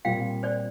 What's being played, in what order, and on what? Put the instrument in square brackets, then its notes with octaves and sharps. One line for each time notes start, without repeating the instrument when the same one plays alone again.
[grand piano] A#2 G3 C4 F4 [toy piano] F5 G5
[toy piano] C5 D5